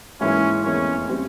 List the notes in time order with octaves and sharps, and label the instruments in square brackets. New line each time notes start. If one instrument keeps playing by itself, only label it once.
[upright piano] G#2 E3 A#3 E4 [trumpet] C#4
[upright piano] F1 E2 E3 A#3 [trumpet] C#4
[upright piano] C#3 G3 C4